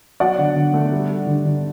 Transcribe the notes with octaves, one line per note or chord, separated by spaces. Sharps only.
F#3 D5 F#5
D3
D3
A3
G3
G3
D3
D3